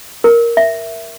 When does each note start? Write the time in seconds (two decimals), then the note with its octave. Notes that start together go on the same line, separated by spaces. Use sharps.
0.24 A#4
0.57 E5